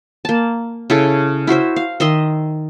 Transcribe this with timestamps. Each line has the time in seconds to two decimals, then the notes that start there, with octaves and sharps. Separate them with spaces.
0.25 A#3 A5
0.90 C#3 E4 A4
1.47 E4 F#4 C5 E5
1.76 F5
2.00 D#3 D#5 E5 C6